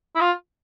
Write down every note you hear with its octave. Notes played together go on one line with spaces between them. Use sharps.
E4
F4